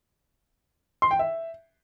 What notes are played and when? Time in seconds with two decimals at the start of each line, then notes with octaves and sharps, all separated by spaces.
1.02 C6
1.11 G5
1.19 E5